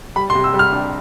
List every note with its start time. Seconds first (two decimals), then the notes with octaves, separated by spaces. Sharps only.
0.16 G3 B5
0.30 C6
0.35 C3
0.44 E6
0.54 G3
0.59 F6
0.72 D4